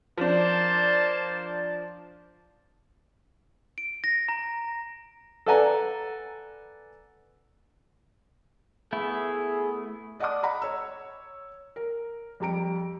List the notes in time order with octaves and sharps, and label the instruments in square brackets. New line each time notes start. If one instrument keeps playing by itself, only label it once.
[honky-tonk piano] F3 D4 [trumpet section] A#3 C5 A5
[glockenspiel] D7
A#6
A#5
[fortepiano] A4 B4 D5 F#5 G#5 A#5
[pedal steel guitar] A3 B3 E4 [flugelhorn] G#4
[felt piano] D5 D#5 F#5 A5 D6 D#6
D#5 F#5 A#5 B5
C#5 E6
A#4
F2 G3 A#5 D7